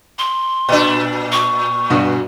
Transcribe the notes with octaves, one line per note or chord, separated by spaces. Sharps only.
C6
A#2 D4
C#6
G2 B2 F#4